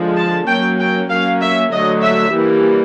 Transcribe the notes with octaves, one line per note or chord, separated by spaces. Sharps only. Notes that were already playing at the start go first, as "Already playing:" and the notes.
Already playing: D3 F3 G#3
A5
F#3 A#3 C#4 G5
G5
F#3 A#3 C#4 F5
E5
D3 F#3 A3 D#5
E5
E3 G3 A#3